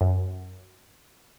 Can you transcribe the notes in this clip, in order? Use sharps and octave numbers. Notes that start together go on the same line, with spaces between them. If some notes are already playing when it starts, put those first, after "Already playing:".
F#2